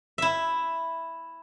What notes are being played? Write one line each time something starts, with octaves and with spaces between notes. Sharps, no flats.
E4 E5